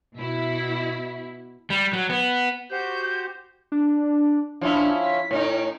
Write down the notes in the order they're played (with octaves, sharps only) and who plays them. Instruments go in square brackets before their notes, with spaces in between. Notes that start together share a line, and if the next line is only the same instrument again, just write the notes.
[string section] B2 E4
[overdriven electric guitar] G3
F#3
B3
[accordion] F#4 G4 C5 [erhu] G6
[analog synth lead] D4
[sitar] F3 C#4 E4 [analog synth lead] D4
[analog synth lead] B6
[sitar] A2 C#4 D#4 [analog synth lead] C#5